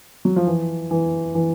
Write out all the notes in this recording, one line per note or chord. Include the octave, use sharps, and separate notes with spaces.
F#3
F3
E3
E3
E3